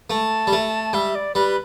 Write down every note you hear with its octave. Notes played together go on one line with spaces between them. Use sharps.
A3 A5
G3
A3
G3 E5
D5
G3 B4